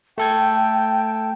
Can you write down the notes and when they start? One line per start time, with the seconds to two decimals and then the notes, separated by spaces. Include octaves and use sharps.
0.18 A3 A4 G5 G#6